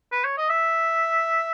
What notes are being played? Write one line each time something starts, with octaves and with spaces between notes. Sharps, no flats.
B4
C#5
D#5
E5